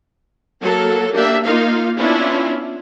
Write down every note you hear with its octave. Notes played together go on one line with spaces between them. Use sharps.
F#3 A#3 A4 A#4
A#3 D4 G4 E5
A#3 D#4 F4 F5
B3 C#4 D4 E4 F4